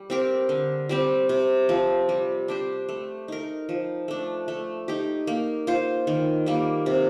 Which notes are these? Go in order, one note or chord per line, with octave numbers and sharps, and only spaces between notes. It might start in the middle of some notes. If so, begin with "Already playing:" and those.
Already playing: G3
C4 G4 A#4
D3
G3 C4 G4
C3
F3 C4
G3
D4 G4 C5
A3
D#4 A#4
F3
A3 D4
A3
D#4 G4
A#3
F4 C5
D#3
G3 A#3
C3